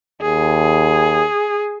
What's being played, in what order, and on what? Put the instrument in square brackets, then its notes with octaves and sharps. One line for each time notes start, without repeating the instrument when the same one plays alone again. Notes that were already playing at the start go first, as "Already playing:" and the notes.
[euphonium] D#2 [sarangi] G#4